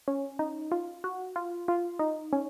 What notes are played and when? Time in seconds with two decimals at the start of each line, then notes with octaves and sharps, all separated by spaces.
0.08 C#4
0.39 D#4
0.72 F4
1.04 F#4
1.36 F4
1.68 F4
1.99 D#4
2.33 C#4